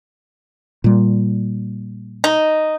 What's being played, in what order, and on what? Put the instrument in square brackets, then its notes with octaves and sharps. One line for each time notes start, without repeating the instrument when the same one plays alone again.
[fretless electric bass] A#2 G3
[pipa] D#4